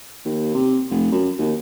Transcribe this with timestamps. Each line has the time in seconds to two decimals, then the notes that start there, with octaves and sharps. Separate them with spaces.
0.25 D#2
0.54 C3
0.90 F1
1.12 F#2
1.39 D#2